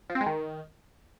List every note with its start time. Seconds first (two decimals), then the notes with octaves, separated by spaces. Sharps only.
0.10 F3
0.15 C4
0.21 G#3
0.26 D#3